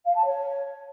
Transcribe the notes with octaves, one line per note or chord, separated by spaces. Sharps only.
F5
A5
C#5